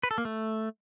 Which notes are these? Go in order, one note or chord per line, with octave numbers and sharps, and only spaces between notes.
B4
A4
A#3
A3